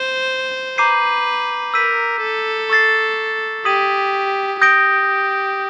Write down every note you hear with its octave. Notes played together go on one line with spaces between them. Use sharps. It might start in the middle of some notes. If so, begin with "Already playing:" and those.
Already playing: C5
B4 A#5 D6 G6 C7 D#7
A#4 E6 G6 B6 D#7
A4
C#6 E6 A6 C7
G4 D#6 G#6 B6 D#7 F#7
G4 D#6 G6 A#6 D7 G7